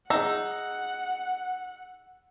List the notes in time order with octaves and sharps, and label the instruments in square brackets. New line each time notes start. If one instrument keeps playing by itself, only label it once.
[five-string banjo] D#4 [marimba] G#4 E5 [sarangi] F#5 [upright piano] E6